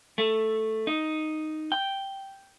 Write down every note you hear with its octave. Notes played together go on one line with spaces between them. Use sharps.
A3
D#4
G5